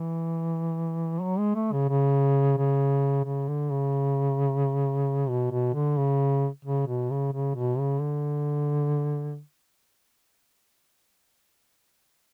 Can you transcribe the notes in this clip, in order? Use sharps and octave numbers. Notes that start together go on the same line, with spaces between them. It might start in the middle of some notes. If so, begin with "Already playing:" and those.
Already playing: E3
F#3
G#3
A3
C#3
C#3
C#3
C#3
D3
C#3
B2
B2
D3
C#3
C#3
B2
C#3
C#3
B2
C#3
D3